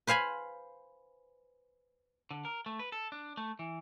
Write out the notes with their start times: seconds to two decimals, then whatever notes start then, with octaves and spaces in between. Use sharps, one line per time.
0.07 B4 C5 F5 G#5 B5
2.31 D3
2.45 A#4
2.66 A3
2.79 B4
2.92 A4
3.12 D4
3.37 A3
3.59 E3